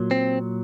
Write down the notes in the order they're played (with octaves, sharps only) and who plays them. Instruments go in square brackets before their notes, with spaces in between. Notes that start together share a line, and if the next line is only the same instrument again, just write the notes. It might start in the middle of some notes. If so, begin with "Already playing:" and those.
Already playing: [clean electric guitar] A#2 F#3
C4